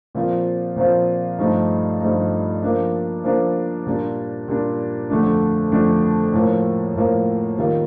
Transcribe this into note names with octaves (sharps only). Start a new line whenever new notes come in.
A#2 F3 C4 F4
A#2 F3 C4 F4
G2 F3 A3 D#4
G2 F3 A3 D#4
F3 A#3 D4
F3 A#3 D4
A#2 G3 D4
A#2 G3 D4
F2 D3 A3 D4
F2 D3 A3 D4
A2 F3 A#3
A2 F3 A#3
D#3 G3 A#3 F4